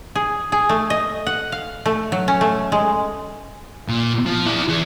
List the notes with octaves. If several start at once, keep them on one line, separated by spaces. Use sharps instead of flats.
G#4
G#4
A3
D#5
F#5
F5
A3
F#3
C#4
A3
G#3
A#2
F3
E4 D5
E3 G#4